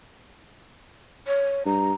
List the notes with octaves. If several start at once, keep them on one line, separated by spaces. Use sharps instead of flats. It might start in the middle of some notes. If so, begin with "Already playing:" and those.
C#5
G2 A#5